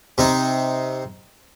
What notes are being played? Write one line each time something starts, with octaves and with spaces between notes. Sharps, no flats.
C3 D#4